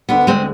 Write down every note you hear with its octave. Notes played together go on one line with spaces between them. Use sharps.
D2 B3 D4
D2 G#3 C4